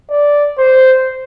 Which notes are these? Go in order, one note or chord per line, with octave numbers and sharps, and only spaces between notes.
D5
C5